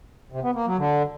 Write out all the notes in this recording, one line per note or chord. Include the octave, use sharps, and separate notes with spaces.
C3
B3
A#3
F#3
D3